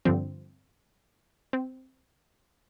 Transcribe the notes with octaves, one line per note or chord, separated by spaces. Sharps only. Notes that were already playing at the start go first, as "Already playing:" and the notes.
G2 D3 F3 C4
C4